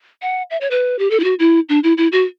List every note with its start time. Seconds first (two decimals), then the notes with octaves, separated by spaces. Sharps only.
0.22 F#5
0.50 E5
0.61 C#5
0.71 B4
0.99 G4
1.10 A4
1.20 E4
1.24 F#4
1.39 E4
1.69 D4
1.84 E4
1.97 E4
2.12 F#4